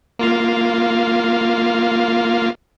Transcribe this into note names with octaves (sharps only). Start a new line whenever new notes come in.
A#3 F4 F5